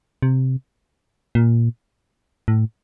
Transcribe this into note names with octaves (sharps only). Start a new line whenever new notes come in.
C3
A#2
A2